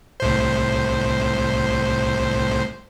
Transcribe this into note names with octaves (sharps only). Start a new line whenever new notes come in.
C2 A2 C5